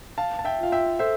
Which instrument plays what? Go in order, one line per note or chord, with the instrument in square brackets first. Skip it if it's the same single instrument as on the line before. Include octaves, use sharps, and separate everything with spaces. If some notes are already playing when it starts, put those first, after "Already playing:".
[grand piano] F5 A5
A5
E5 G5
[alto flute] F4 [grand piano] F5
[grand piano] E5 G5
[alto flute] A4 [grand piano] C5 E5